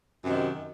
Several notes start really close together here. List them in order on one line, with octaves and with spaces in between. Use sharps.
F#2 C3 D#3